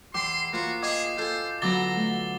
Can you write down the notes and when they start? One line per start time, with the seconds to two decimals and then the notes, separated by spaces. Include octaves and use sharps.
0.14 E2 G5 C6 D6 C7
0.53 A#3 F4 F#4 C5
0.83 G#4 D#5 G5 D6
1.17 F4 A4 C5 G#5
1.62 D3 F#3 B3 A#5 D6 A6 G7
1.96 A3